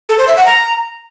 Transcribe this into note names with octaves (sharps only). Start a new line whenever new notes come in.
A4
C5
E5
F#5
A#5